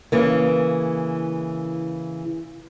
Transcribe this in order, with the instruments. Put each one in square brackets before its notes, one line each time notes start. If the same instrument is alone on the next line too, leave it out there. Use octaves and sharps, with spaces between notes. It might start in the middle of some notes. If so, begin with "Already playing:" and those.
[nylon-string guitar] C#3 E3 A#3